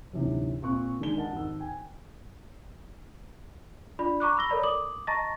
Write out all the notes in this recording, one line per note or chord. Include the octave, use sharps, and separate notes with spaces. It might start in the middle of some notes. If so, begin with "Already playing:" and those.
D2 G#2 C3 E3 F#3
A#2 C4 C#6 F#6
D#3 G#3 D4 G7
A#4 D#5 F#5 A5
G#1 E6
G5 G#5
D4 F4 D5 B5
A#5 C#6 D6 F#6
B5 E6 A#6 G7
A4 A#4 C#5 D5 A#5 B5
D6 D#6 F#7
D#5 A5 A#5 C#6 A6 A#6